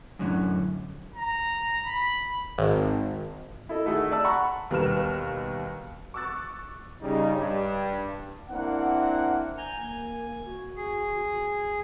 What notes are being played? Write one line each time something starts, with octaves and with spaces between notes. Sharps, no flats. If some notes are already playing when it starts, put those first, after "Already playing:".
F#2 A2 D3 F#3
A#5
B5
G#1
E4 A4 D#5
D#3 A3 F#4 G#4 A4
D5 A5 E6
F#5 A#5 B5 C#6
D#2 B2 G3 B4 F6 E7
C#6 D6 E6 F#6 A6
C#3 G3 D#4
G2
A#3 C4 D4 E4 F#5
G#5 A#5 G6
A#3 G#5
F#4
G#4